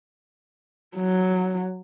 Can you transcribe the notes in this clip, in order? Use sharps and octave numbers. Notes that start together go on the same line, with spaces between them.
F#3